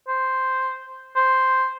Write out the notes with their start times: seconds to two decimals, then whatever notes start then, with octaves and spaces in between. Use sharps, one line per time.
0.07 C5
1.15 C5